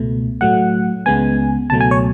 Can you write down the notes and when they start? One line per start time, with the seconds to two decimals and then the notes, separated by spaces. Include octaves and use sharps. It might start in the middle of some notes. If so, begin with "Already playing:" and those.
Already playing: C#2 B2 A3
0.41 A2 F#3 A3 F#5
1.06 C#2 C#3 G#3 B3 G#5
1.70 C#2 B2 F#3 A3 A5
1.80 G#5
1.91 C#5